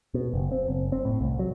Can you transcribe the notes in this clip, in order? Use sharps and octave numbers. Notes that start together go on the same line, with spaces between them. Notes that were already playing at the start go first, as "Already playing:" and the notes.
B2
F#1
C4
F#1
C4
A2
C2
F#3